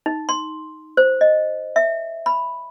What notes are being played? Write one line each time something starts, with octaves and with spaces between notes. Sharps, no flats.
D#4
C6
C5
D#5
E5
B5